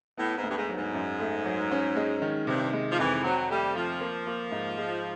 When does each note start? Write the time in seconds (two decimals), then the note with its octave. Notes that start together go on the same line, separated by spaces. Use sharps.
0.18 A2 B3
0.37 G#2
0.43 D2
0.49 G2
0.56 G#2
0.69 F#3
0.76 G#2
0.94 F#2
1.20 A3
1.45 F#3
1.72 C#4
1.96 G#3
2.22 D#3
2.47 G2 C3
2.73 G#3
2.92 F3
2.99 F2 E3
3.24 F#3 C4
3.50 G3 A3
3.75 F3 F4
4.01 A#3
4.27 A#3
4.52 G#2
4.78 G#3